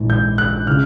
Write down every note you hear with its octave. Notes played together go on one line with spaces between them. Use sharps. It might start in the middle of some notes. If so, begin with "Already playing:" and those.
Already playing: A#1 G#2 E3 G#3
G6
F#6
C#3 F6